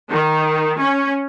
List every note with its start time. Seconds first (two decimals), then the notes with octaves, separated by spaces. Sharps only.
0.10 D#3
0.79 C#4